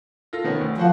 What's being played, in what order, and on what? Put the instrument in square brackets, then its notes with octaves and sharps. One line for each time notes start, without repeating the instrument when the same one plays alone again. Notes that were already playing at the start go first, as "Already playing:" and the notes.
[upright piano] F4 A4 A#6
D#3 B3 C#4
D2
[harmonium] F3 [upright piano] F#4 C5 F#5